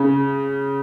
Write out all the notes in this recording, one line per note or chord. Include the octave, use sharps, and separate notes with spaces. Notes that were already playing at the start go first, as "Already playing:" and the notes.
Already playing: C#3